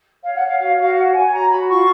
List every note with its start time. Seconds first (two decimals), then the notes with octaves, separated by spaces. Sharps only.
0.23 C#5 F5
0.35 F#5
0.42 C#5
0.48 F5
0.59 F#4 F5
0.78 F#4 F5
0.96 C#5 F#5
1.14 C#5 G#5
1.33 F#4 A#5
1.51 F#4 B5
1.69 F4 C#6